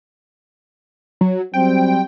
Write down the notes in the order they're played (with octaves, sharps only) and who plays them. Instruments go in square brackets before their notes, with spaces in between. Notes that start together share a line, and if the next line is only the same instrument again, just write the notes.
[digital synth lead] F#3
[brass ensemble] F#3 G3 C4 [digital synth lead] G5